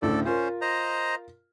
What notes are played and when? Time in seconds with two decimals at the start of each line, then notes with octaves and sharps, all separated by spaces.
0.02 D2 A2 C#3 A4 D5
0.25 C#4 F4 A#4 C5
0.61 C5 D#5 A#5